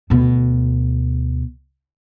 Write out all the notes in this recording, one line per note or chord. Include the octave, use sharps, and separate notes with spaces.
D2 B2